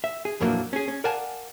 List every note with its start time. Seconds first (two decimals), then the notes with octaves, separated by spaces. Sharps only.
0.04 E5
0.25 G#4
0.40 F2 A#2 E3 F#3 A#3 D4
0.73 C#4 G#4
0.88 C#4
1.04 A#4 D5 F5 F#5 G#5 A5